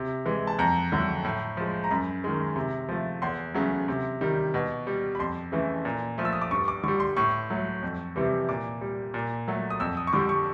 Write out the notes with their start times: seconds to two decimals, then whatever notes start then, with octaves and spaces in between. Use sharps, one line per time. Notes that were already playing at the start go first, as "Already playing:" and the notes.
Already playing: C3
0.26 E3 G#3
0.47 A5
0.59 F2 A#5
0.92 D3 F#3 A3
1.25 A2
1.57 F3 G#3
1.84 A#5
1.91 F#2 B5
2.24 D#3 G#3
2.56 C3
2.88 F3 A3
3.22 E2 C6
3.54 C#3 F#3 A3
3.88 C3
4.21 D#3 G3
4.54 B2
4.87 G3
5.15 B5
5.19 F2 C6
5.52 C#3 E3 A3
5.85 A#2
6.18 F3 A3
6.25 E6
6.33 D#6
6.42 D6
6.51 G2 C#6
6.68 D6
6.84 D3 G3 C#6
7.00 C6
7.17 A2 C#6
7.50 F#3 A3
7.83 F2
8.16 C3 E3 G3
8.49 A#2 D6
8.81 G3
9.14 A#2
9.48 F#3 A3
9.70 D#6
9.80 F2 E6
9.97 D#6
10.07 C#6
10.13 D3 G3 D6
10.29 C#6